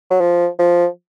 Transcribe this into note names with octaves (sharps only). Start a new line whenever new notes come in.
F#3
F3
F3